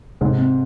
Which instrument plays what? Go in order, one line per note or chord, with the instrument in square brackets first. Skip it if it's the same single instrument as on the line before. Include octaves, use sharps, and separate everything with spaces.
[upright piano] G#2 [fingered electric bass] C3
[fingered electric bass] C4